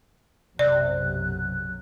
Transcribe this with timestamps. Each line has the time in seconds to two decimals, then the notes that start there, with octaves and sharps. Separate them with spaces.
0.59 B1 F#2 C3 F#3 D5 F#6